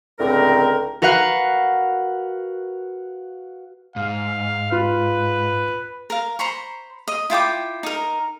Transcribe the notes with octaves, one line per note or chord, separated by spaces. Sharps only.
C#2 A2 D3 C4 A#4
F#4 A#4 B4 F5 F#5
G#2 F5
F4 B4
A#4 F5
C5 A#5 B5 C#6
D#5
E4 F4 G5 D6
D#4 A#4